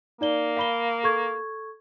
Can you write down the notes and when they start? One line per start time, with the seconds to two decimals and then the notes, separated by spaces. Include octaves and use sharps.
0.21 A#3 D#4 D5 G7
0.57 F5 B5 G7
1.04 A4 C#6 G#6